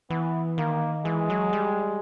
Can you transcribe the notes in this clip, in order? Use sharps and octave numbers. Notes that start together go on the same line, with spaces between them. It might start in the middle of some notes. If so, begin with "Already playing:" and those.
E3 B3
D#3 A#3
E3 G#3
F#3
G3